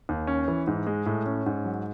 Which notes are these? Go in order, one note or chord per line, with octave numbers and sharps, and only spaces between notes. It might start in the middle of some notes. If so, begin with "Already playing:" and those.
D#2
C#4
E3
G#2
G#3
A2
C#4
G#2
F#3